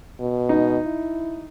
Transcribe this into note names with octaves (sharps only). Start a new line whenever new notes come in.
B2
D#4
E4